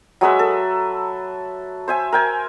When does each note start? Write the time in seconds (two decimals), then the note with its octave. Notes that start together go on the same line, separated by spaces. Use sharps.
0.21 F#3 G#3 B4 E5
0.39 A4
1.88 C5 E5 G#5
2.12 A#4 G5 G#5